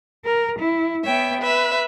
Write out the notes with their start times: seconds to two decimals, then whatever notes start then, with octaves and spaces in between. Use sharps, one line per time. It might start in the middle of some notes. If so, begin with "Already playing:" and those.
0.25 A#4
0.58 E4
1.05 B3 C#5 E5 G5
1.40 B4 E5